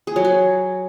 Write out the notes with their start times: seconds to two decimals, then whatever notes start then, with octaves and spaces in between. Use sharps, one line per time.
0.07 G#4
0.16 F#3
0.25 F#4